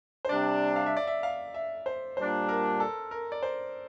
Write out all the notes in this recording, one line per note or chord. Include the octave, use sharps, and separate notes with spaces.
C5
C3 G3 D4 D5
F5
E5
D5
E5
F5
E5
C5
A#2 G3 D4 C5
A#4
A4
A#4
D5
C5